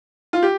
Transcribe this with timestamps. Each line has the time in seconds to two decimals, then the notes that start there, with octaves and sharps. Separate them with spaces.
0.33 F4
0.43 G4